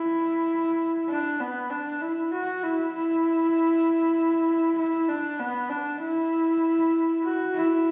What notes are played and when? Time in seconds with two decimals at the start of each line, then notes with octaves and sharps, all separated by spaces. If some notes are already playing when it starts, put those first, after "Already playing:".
Already playing: E4
1.09 D4
1.40 B3
1.71 D4
2.01 E4
2.32 F#4
2.64 E4
2.94 E4
4.79 E4
5.08 D4
5.39 B3
5.70 D4
6.02 E4
7.24 F#4
7.55 E4